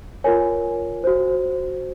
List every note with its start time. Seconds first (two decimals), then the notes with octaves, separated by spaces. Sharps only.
0.24 F4 A#4 C#5 G#5
1.04 F#4 C5